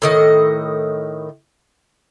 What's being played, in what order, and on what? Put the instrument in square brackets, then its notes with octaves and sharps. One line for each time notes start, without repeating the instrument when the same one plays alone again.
[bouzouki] A2 D#3 D#5